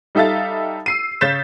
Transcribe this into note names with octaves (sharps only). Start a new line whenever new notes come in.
G3 D#4 A4 E5 F5 A6
E6 C7 D#7
C#3 C#5 G6 A6 B6 E7